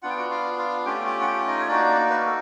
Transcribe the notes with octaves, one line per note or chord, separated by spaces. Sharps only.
B3 D4 F4 F#5
G5
F#4 F#5
F4 F5
F4 F5
A3 C#4 F4 G4 G5
G4 G5
F#5
G4 G5
D#4 D#5
C#5
A#3 D4 D#4 F#4 D5
B4
A#4
A4